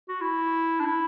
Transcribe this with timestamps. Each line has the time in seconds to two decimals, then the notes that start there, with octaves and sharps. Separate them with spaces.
0.09 F#4
0.21 E4
0.80 D4
0.86 E4